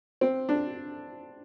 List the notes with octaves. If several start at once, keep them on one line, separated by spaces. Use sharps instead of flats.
C4
D4